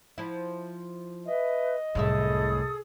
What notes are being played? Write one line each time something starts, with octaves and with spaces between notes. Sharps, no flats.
F3 E4
B4 D#5 E5
C2 F#2 A2 C3 G#4 A4 E5 D#6